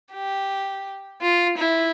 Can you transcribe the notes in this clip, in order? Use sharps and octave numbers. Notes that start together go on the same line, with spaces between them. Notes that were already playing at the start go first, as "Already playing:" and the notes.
G4
F4
E4